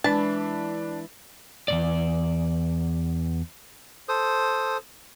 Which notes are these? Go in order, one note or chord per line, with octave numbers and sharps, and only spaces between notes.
E3 G#3 D4 A5 F#6
E2 G#2 D5
A4 C5 D#6